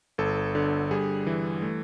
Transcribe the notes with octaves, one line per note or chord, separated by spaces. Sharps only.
G1 A4
D3
G3 G#4
E3
A3